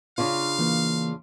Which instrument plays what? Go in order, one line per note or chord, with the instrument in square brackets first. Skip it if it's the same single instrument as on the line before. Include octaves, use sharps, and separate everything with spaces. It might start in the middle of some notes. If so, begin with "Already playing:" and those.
[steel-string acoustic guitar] C#3 D4 F4 [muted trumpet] F5
[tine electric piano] E3 A#3